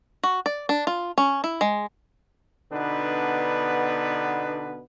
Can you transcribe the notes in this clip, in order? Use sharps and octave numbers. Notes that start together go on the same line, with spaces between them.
F#4
D5
D4
F4
C#4
E4
G#3
B2 D3 B3 D4 D#4 B4